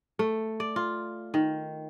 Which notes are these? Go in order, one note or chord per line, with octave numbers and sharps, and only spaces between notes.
A3
D5
F4
D#3